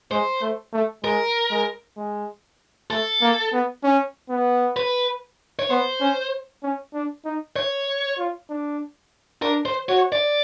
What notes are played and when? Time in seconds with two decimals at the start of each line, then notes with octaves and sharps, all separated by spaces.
0.11 G#3 C5
0.42 A3
0.73 A3
1.04 G#3 A#4
1.50 G#3
1.97 G#3
2.90 A3 A4
3.21 A#3
3.53 B3
3.84 C#4
4.30 B3
4.77 B4
5.59 C#5
5.70 B3 C5
6.01 C#4
6.63 C#4
6.94 D4
7.25 D#4
7.56 C#5
8.18 F4
8.50 D4
9.42 D4 A#4
9.66 C5
9.89 F#4 C#5
10.12 D5